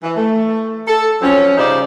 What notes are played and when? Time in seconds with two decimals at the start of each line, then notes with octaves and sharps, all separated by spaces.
0.04 E3
0.16 A3
0.88 A4
1.22 F3 F#3 C4 C#4
1.57 C#3 G3 D#4 C5 D5